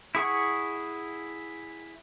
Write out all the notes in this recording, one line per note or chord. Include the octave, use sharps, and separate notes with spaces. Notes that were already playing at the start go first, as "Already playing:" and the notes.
E4 G#4 F#5 C#6